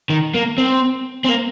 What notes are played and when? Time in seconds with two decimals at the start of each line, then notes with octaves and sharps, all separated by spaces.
0.10 D#3
0.34 A#3
0.58 C4
1.24 C4
1.29 A#3